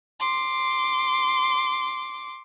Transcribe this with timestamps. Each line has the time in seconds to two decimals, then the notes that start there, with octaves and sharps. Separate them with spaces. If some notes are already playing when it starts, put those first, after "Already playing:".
0.20 C6 D6